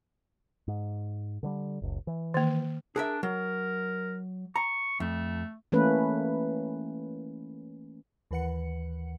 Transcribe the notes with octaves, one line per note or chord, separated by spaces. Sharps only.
G#2
D3 F3 G3
F#1 C#2
E3
D#3 A#3
D4 G#4 A#4 E5
F#3 A#4
A#5 C#6
F2 A3
E3 A3 A#3 C#4 B4
D#2 E3 B4 F#5 C#7